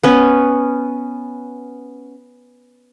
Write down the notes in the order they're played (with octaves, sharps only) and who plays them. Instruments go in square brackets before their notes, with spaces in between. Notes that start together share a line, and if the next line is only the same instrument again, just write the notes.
[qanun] B3 C#4